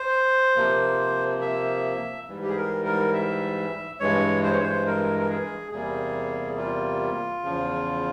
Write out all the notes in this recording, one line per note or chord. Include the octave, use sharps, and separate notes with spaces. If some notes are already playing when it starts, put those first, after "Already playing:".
Already playing: C5
C3 F3 A#3
E5
G#2 E3 G3
G4
G#4
A#4
A#4
E5
G2 E3 G#3 C#5
C5
C#5
C5
A#4
A#4
G#4
E2 C3 G3 A#3 G#4
F4
E2 C#3 F3